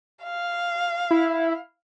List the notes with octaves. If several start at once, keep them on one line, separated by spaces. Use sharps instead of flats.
F5
E4